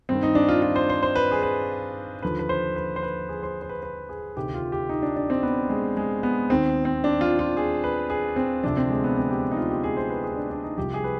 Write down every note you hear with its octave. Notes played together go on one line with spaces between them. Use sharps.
G2 D#3 C4
D#4
D4
F4
F4
C5
C5
C5
B4
G#4
B4
D#2 D3 F3 B4
B4
C5
B4
C5
B4
G#4
C5
C5
B4
B4
G#4
D2 C3 D#3 G4
F4
G4
D#4
D4
D4
C4
B3
G#3
G#3
B3
D#2 D#3 C4
C4
D4
F4
F4
G#4
B4
G#4
C4
D2 C3 F3 D4
C4
G#3
B3
C4
G4
D#4
F4
G4
G#4
C5
B4
G#4
D4
D4
D#4
C2 C3 F3 G4
G#4
B4